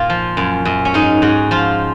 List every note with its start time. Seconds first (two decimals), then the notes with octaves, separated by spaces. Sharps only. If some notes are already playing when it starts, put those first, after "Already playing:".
Already playing: A#2 F4
0.10 F3
0.37 F#2
0.65 F#2
0.85 C#4
0.94 G#2 D#4
1.22 G#2 F#4
1.51 F3 F4